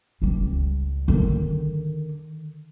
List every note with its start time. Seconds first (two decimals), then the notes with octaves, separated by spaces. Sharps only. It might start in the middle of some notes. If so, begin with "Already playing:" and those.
0.22 C#2 G3
1.08 D3 D#3